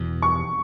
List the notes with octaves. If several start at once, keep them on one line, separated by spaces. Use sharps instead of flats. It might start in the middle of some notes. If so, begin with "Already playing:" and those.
Already playing: E1 E2 B2
C#6